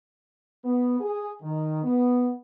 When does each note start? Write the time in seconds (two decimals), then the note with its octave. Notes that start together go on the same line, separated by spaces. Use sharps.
0.64 B3
1.00 G#4
1.42 D#3
1.83 B3